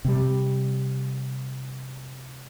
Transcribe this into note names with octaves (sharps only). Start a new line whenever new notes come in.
C3 G3